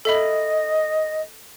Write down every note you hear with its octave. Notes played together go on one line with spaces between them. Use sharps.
A4 D#5 E5 B5